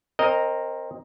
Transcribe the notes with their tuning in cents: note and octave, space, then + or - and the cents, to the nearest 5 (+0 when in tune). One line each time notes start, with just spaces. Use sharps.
C4 +20 A#4 +0 D#5 +0